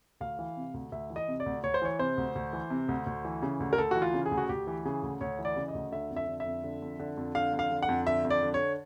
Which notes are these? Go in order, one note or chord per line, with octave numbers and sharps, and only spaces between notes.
D2 F5
E3
C3
D2
D2 E5
E3
D#5
C3
D5
D2
D2 C#5
C5
E3 C#5
C3 C5
D2
D2
E3
C3
D2
D2
E3
C#3
D2
A#4
D2 A4
E3 F#4
F4
C#3
G#4
D2
F#4
D2 G4
E3
C#3 G#4
D2
D2 C#5
E3
D5
C#3
D#5
D2
D3 E5
F2
E5
D3
E5
F2
D3
F2
D3
F2
D3 F5
F2
F5
D3
F#5
F2
D3 E5
F2
D5
D3
C#5